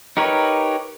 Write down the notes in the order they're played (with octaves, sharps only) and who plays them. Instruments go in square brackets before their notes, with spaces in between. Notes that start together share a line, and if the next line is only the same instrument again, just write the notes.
[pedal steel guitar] D#4 G4 A#4 B4 C#5